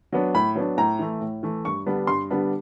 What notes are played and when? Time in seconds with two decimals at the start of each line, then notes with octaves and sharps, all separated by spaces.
0.13 F#3 B3 D4
0.34 A2 B5
0.55 F#3 B3 D4
0.77 A2 A#5
0.99 E3 A3
1.21 A2
1.43 E3 A3
1.65 G2 C#6
1.86 D3 G3 B3 D4
2.07 G2 C6
2.30 D3 G3 B3 D4